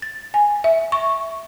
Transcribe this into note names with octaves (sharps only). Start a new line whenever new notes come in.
A6
G#5
E5
C#6